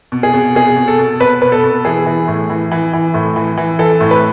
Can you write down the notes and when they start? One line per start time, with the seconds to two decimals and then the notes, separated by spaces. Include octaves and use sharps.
0.12 B2
0.23 G#4
0.34 B2
0.55 B2 G#4
0.77 B2
0.88 A4
0.99 B2
1.20 B2 B4
1.42 B2 B4
1.52 A4
1.64 B2
1.85 E3 G#4
2.06 E3
2.28 A2
2.50 E3
2.71 E3
2.93 E3
3.14 A2
3.36 E3
3.57 E3
3.79 E3 A4
4.00 A2
4.11 B4